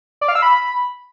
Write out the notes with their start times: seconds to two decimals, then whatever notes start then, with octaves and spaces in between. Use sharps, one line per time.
0.21 D5
0.28 F5
0.35 E6
0.42 B5